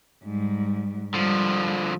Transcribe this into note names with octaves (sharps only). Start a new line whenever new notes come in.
G#2 G3
D3 F3 G3